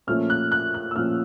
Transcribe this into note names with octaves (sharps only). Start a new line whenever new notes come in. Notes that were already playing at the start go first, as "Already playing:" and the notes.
A#2 F3 A3 C#4 F6
F#6
F#6
F#6
E6
A#2 F3 A3 C#4 F6